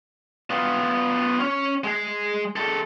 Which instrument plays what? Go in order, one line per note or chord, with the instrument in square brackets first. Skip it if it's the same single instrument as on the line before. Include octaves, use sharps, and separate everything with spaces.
[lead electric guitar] B3 F4
C#4 C#5
G#3 G#4
G#3 A4